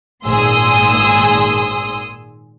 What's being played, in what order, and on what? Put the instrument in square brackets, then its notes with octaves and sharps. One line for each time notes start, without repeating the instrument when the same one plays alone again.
[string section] G#1 A#2 G#4 C6 D#6 E6